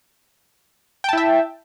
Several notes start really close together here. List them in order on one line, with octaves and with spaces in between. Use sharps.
G5 A5 E4 E5